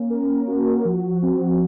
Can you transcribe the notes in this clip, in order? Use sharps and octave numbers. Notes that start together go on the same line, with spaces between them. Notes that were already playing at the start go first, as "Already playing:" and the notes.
Already playing: A#3 C#4
A#4
F#4
F3
C4